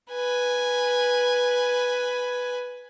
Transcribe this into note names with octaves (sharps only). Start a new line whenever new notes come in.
B4 G#5